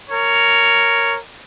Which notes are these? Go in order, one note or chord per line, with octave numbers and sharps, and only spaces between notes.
A#4 C#5